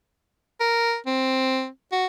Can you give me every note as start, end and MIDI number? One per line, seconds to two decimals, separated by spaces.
0.60 0.97 70
1.07 1.67 60
1.92 2.07 66